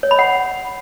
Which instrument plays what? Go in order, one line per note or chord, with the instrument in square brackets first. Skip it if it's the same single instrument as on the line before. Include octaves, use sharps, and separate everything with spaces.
[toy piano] C#5
B5
F#5